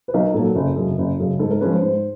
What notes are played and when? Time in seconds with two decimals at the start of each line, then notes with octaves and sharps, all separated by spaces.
0.08 B4
0.14 B1 A#4
0.34 A#2 F#3 A4
0.56 F#1
0.76 F#2 C#3
0.98 F#1
1.19 F#2 C#3
1.39 G#2 A4
1.51 A#4
1.61 F3 G#3 C#4 B4
1.71 C5
1.81 G#2 C5